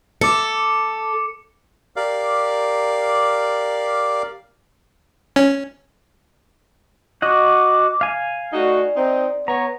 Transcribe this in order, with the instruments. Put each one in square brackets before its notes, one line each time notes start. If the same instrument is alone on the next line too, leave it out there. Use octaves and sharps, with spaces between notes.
[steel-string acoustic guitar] A4 [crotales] D6 C#7
[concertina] G4 A#4 D5 F5
[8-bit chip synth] C#4
[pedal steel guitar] F#4 D#5 F#5 [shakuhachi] D6
[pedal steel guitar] F5 G#5
[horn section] A3 D#4 F#4 [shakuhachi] D5
[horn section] C4 D#4
[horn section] B3 C#5 [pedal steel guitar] A#5